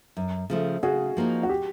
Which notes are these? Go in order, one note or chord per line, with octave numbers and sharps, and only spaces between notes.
F#2
C#3 F3 A3
C#3 F#4 G#4
F3 A#3 D#4
F#4
G4